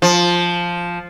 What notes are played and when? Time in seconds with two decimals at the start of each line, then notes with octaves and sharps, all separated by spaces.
0.02 F3